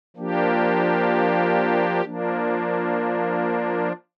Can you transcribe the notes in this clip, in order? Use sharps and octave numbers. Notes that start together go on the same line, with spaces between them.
F3 A#3 D4 G4
F3 A#3 D4